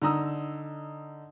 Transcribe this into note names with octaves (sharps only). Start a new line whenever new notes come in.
D3 D#4 A#5 D#6 E6